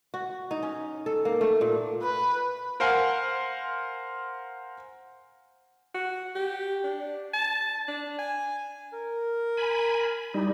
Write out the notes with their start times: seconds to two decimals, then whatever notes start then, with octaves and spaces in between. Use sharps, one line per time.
0.14 F#4
0.51 D#4
0.63 C#4
1.06 A4
1.25 A#3
1.41 A3
1.61 A#2
2.02 B4
2.80 A#4 C5 F5 F#5 G#5
5.95 F#4
6.35 G4
6.84 D4
7.34 A5
7.88 D4
8.19 G#5
8.93 A#4
9.57 G#5 B5
10.34 G3 D#4 E4